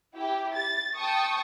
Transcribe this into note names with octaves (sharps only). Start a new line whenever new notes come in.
E4 G4
A6
G5 A5 C#6 D#6